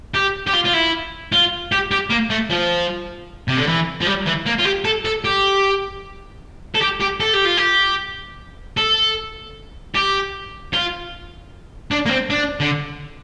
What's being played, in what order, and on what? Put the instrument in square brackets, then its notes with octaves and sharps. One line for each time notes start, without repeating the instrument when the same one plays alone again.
[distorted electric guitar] G4
G4
F4
F4
E4
F4
G4
G4
A#3
A3
F3
C3
D3
E3
F3
G3
E3
A#3
F4
G4
A4
A4
G4
A4
G4
G4
A4
G4
F4
G4
A4
G4
F4
D4
A#3
C4
D4
D3